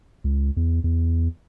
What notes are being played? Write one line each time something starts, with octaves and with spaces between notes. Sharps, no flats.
C#2
E2
E2